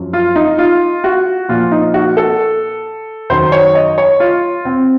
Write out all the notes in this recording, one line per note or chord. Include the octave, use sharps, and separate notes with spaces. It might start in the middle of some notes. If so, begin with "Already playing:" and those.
Already playing: F#2 F3
F4
D#4
F4
F#4
A#2 F3 F4
D#4
F#4
A4
F#2 D#3 F#3 C5
C#5
D#5
C#5
F4
C4